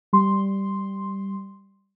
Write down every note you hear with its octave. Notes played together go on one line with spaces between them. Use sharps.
G3 C6